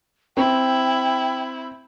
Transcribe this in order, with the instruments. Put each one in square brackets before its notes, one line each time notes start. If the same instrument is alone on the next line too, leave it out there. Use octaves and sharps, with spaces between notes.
[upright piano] C4 [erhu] E4 [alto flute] G5